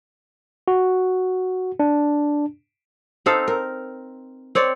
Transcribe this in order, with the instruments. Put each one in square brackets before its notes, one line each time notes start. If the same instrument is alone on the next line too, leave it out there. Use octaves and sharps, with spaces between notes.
[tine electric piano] F#4
D4
[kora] C4 D#4 A4 F5
A#4
C4 C#5 D5